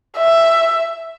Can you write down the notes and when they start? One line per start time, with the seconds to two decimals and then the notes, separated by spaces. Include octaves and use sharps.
0.17 E5